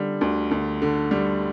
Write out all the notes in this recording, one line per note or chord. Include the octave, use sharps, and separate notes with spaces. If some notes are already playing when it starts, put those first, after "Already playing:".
Already playing: D3 G3
D2
D2
D3
G3